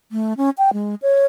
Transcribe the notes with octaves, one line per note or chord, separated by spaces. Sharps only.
A3
C#4
G5
G#3
C#5